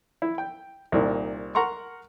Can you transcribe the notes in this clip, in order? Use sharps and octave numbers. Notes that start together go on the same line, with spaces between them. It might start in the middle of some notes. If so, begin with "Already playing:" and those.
E4
G5
C2 A#2 D#3
A#4 F#5 A#5 C6 C#6